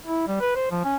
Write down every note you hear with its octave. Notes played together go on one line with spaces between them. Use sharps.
E4
G3
B4
C5
F3
C#4